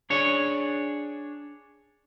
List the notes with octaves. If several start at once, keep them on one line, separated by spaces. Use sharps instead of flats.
D4 G#4 C#5